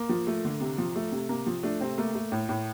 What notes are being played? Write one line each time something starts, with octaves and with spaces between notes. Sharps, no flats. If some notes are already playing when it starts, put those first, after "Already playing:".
Already playing: A#3
F3
A3
D3
C3
F3
A3
C3
C3 A#3
F3
A3 D4
C3 C4
A3 A#3
A3
A2
A2